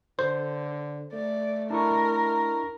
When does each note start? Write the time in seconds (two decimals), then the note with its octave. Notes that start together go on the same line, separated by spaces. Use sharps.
0.19 D3 C5
1.13 A3 D5
1.70 D4 E4 A#4 C#6